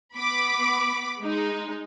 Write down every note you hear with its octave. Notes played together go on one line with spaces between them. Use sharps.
B3 B5 D6
G#3 D#4